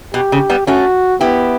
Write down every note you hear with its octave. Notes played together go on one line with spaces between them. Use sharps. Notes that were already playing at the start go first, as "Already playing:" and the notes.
B2 G4
C#3
G3 B3
A3 C#4 F#4
B3 E4 G4